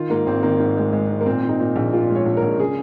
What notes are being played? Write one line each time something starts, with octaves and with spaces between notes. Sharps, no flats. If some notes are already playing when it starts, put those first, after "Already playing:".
Already playing: D#3 F4
G#2 A#3
G#1 C4
D#3 A#3
G#2
G#3
G#3
D#3
A#3
A#2 C4
A#2
D#4
A#2
A#1
A#2 F4
G#3
C#5
A#1
A#4
A#1
C#3 G#4